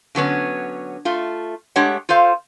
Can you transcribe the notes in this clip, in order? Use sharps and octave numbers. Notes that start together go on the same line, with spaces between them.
D3 F#3 B3 C#4
A3 F4
G#3 A3 D4 G4 C#5 F#5
F4 A4 C5 F5